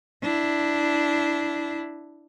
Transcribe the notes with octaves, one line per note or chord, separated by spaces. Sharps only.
D4 E4